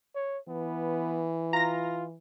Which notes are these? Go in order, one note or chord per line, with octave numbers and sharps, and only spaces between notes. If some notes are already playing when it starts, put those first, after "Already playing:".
C#5
E3 B3
F4 A#5 A#6